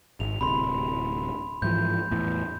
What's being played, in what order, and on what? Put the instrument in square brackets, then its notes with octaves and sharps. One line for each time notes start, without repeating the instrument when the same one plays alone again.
[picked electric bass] G#1 [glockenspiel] F7
[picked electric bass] D1 C3 [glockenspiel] B5 C6
[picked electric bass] G#2 E3 F3 [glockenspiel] G6
[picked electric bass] E2 A2